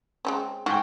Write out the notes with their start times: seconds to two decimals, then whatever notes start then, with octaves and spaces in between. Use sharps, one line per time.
0.25 G#3 C4 C#4
0.66 G#2 F#4 G5